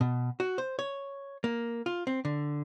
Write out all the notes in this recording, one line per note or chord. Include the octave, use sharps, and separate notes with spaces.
B2
F#4
C5
C#5
A#3
F4
C4
D3